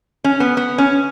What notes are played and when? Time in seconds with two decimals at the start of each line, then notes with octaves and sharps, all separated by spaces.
0.24 C#4
0.40 B3
0.57 B3
0.78 C#4